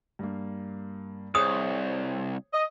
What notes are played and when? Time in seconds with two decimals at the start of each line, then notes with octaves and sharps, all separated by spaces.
0.19 G2 A#3
1.35 C2 G#4 C5 C#5 D#6
2.53 D#5